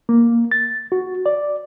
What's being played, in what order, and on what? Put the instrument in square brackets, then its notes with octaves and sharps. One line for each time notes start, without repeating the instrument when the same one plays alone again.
[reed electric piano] A#3
A6
F#4
D5